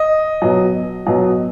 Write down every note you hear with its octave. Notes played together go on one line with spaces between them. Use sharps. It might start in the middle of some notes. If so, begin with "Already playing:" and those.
Already playing: D#5
B2 F#3
B2 F#3